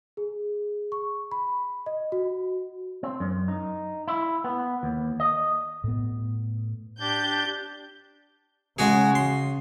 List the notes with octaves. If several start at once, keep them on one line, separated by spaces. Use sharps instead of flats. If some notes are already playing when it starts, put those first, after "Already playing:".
G#4
C#6
B5
D#5
F#4
C4
F#2
D#4
E4
B3
D#2
D#5
A2 B3
D4 G4 G6 A6
C#3 G#3 F#4 G#4
C6